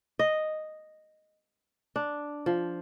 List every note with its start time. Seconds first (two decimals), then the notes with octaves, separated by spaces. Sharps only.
0.19 D#5
1.96 D4
2.46 F3